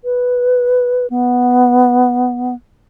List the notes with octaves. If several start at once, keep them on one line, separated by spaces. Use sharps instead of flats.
B4
B3